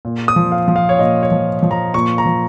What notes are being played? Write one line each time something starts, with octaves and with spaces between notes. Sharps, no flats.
A#2
D#6
F3
F5
F3
F5
C#5
A#2 D#5
C#5
F3
F3
A#5
A#2 C#6
A#5
F3